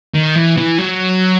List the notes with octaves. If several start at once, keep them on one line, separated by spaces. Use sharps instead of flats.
D#3
E3
E3
F#3